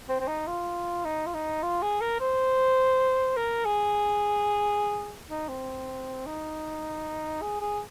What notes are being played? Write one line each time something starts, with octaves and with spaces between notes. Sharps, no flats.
C4
C4
D#4
F4
D#4
F4
D#4
F4
G#4
A#4
C5
A#4
G#4
D#4
C4
D#4
G#4
G#4